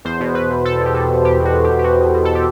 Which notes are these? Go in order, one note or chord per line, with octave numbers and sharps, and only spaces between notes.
E2 C5
B2
B2 B4
E2
E2 A4
B2
G4
B2 A4
E2
E2 G4
B2
F#4
B2
G4
E2
G4
E2 F#4
B2
B2
A4
G4